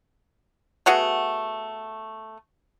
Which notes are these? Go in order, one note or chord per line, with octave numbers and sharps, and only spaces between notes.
A3 B3 F#4 G#4